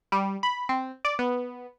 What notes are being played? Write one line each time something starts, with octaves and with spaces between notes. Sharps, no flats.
G3
B5
C4
D5
B3